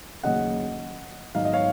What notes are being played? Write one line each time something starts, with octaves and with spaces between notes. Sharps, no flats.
D#2 C#3 F#3 C#4 D#5 F#5
G#2 D#3 F#3 B3 D#4 F5
D#5
C#5 F5